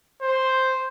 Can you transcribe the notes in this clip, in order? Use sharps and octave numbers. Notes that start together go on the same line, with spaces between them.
C5